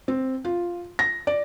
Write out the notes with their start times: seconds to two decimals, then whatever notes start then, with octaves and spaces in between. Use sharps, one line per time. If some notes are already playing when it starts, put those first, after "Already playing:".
0.08 C4
0.45 F4
0.99 A#6
1.27 D5